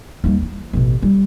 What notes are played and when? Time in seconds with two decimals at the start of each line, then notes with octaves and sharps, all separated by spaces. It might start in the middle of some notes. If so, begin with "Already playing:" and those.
0.24 D#2 G3
0.42 E3
0.73 A1 B2
1.03 G3